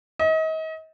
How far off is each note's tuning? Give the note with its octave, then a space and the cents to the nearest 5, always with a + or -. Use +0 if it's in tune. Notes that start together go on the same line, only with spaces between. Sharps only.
D#5 +35